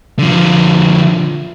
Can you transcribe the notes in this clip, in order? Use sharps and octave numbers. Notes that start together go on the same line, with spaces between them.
D3 F3